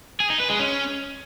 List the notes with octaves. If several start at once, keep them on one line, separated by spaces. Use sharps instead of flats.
G#4
D#4
B4
G#3
C#4